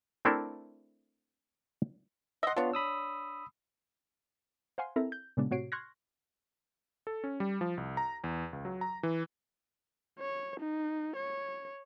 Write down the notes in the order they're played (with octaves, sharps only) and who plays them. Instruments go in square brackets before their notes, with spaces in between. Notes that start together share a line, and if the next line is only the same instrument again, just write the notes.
[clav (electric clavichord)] A3 C4 D4 E4 A4 A#4
[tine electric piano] D#5 C6 [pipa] E5 F#5
[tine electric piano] B3 F4 [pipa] D4 C#5
[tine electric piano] B5 D#6 E6
[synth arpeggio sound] C5 F5 F#5 G#5 C6
C4 E4 A4 A#4 E5 A#5
G6
A#2 C#3 G#3 B3 D4
A2 C3 F#4 C#5 C7 D7
C6 C#6 F6 F#6 G#6 A#6
[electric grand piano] A4
C#4
G3
F3
C2
A#5
E2
C#2
F#3
A#5
E3
[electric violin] C#5
D#4
C#5